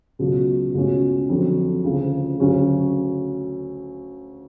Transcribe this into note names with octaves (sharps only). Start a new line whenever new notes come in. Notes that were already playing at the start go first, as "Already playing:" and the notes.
C#2 B2 F#3
C#2 B2 A3 C#4 F#4
F2 D3 F#3
D2 C#3 F3
D2 C#3 F#3 C#4 F#4